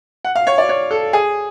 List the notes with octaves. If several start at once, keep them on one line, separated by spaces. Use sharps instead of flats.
F#5
F5
C#5
D5
C#5
A4
G#4